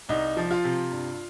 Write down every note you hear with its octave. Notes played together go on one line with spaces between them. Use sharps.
C2 D#4
F3
F4
C3
G2